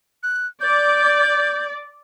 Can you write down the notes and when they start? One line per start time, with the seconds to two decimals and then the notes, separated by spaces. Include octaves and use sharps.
0.23 F#6
0.61 D5 G6